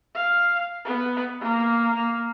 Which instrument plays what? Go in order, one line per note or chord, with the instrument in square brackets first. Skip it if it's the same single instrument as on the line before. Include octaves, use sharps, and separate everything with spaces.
[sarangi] F5
B3
A#3
A#3